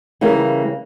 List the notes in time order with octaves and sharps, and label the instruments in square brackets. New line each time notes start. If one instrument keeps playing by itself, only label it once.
[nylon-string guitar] C#3 E3 G3 A#3